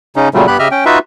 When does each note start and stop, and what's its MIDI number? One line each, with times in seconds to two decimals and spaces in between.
0.16 0.29 49
0.16 0.29 61
0.16 0.29 63
0.34 0.46 46
0.34 0.46 49
0.34 0.46 54
0.34 0.46 55
0.34 0.46 57
0.48 0.58 43
0.48 0.58 59
0.48 0.58 67
0.48 0.58 83
0.48 0.58 90
0.59 0.68 49
0.59 0.68 67
0.59 0.68 75
0.59 0.68 76
0.59 0.68 89
0.71 0.84 61
0.71 0.84 79
0.85 0.99 63
0.85 0.99 65
0.85 0.99 66
0.85 0.99 71
0.85 0.99 76